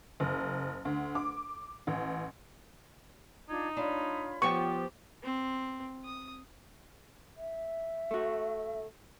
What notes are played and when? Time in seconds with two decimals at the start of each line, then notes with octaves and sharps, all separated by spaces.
0.20 F#1
0.85 D2
1.15 D6
1.87 A1
3.49 D4 D#4 F4 G#6
3.77 D4 F4 C#5 B5
4.42 F3 B3 G4 C#5 G5 C#6
5.24 C4
6.05 D#6
7.37 E5
8.11 A3 F#4